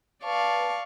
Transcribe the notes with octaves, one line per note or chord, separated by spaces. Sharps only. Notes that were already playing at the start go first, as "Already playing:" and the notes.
B4 D5 F5 A5 C#6